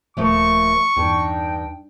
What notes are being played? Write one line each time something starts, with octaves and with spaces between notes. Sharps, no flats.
D#1 F3 A3 A#3 C#6
E2 G2 D4 D#4 G5